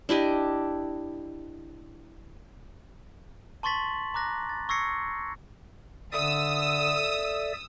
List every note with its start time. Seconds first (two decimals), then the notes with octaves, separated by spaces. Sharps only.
0.09 D4 E4 G4 D#5
3.63 A5 C6 C#6 A6 B6 F#7
4.14 A#5 D6 F#6 A#6
4.49 A6
4.69 C#6 E6 G#6 A#6 C7 C#7
6.12 D3 A4 D5 E5 D#6 E6